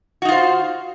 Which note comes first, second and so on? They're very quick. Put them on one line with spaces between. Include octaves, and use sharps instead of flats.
F#4 D#4 F4 C5